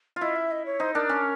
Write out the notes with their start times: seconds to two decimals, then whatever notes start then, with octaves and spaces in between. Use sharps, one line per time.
0.16 F4
0.21 E4 D#5
0.36 E5
0.51 D#5
0.66 C#5
0.80 D#4 C5
0.94 D4 A#4
1.09 C#4